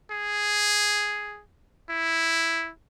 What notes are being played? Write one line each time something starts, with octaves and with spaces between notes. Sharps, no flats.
G#4
E4